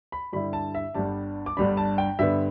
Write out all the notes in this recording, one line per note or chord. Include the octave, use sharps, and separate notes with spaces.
B5
G2 D3 G3 E4 B5
A5
E5
G1 G2 G3 D4 A5
D6
G1 G2 G3 D4 B5
A5
G5
G2 D3 B3 E5